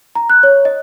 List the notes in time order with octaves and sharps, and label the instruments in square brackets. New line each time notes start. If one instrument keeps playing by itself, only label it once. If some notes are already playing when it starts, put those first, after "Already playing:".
[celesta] A#5
F#6
C#5
D#5